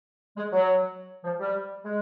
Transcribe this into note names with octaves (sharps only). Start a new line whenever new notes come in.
G#3
F#3
F3
G3
G#3